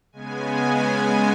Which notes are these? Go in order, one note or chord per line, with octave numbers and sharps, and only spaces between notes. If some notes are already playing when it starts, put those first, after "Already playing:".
C#3 G#3 B3 G#5